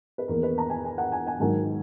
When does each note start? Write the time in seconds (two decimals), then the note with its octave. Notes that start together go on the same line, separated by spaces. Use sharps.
0.18 B4
0.28 E2 D#3 A#3 A#4
0.43 B4
0.58 A#5
0.70 G#5
0.85 G#5
0.98 F#5
1.12 G#5
1.27 G#5
1.40 G#2 D#3 F#3 G#5